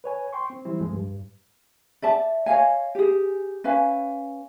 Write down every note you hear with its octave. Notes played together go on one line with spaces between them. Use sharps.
B4 C#5 G#5
G5 C6 C#6
C4
E3 G3 C4 E4
C#2 G2 F3 G#3
G2
D5 E5 A5
C#5 D#5 F5 G#5
G4 G#4
C#4 B4 F5 G#5